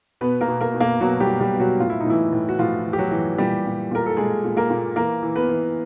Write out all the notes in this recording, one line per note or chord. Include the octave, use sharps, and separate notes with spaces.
B2 B3 B4
A#3 A#4
B2
A#3 A#4
B2
A#3 A#4
B2 F#3 F#4
G3 G4
B2
G3 G4
B2
F#3 F#4
A2 F4
E4
D#4
A2 E3 E4
A2
F#4
A2 F3 F4
E3
G4
F#3 F#4
E3
A#2 G3 G4
A#2
A#2 A#4
A4
A#2 G#3 G#4
A#2
A#3 A#4
A#2
E3 A#3 A#4
E3
B3 B4
E3